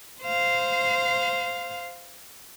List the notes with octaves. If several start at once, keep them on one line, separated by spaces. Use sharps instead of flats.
C5 F5